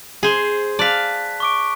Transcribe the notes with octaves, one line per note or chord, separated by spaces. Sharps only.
G#4 C5
D5 F5 A5 F#6 B6
C#6 D6 D7